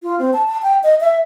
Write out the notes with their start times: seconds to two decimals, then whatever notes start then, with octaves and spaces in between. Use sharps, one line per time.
0.03 F4
0.19 C4
0.33 A5
0.48 A5
0.63 G5
0.83 D#5
1.01 E5